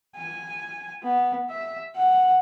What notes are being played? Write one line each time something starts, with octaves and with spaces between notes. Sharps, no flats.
G#5
B3
E5
F#5